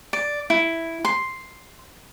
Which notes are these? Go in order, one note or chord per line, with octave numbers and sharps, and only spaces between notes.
D5
E4
C6